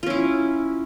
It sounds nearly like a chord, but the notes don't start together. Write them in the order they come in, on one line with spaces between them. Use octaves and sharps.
F4 C#4 E4